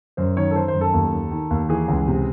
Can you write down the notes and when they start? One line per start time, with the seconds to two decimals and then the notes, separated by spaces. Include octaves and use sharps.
0.17 F#2 C5
0.37 D#3 C#5
0.51 A4
0.55 D#3 C5
0.68 C5
0.74 F#2
0.81 A4
0.94 D#2
1.13 D#3
1.31 D#3
1.50 D#2
1.69 E3 G#4
1.88 C#2
2.08 C3